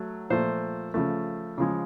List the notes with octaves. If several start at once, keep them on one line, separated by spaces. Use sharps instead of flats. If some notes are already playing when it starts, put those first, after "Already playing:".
Already playing: F#3 A3
A#2 F3 A3 C5
C#3 F3 A3
C#3 F3 G#3